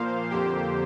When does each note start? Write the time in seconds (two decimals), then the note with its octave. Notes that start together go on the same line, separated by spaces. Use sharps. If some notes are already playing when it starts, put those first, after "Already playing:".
Already playing: A#2 F3 A#3 C5 F5
0.30 F2 D3 A#3 G4 C5